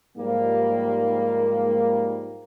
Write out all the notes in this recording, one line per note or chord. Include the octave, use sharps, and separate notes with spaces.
G#2 F3 G3 A#3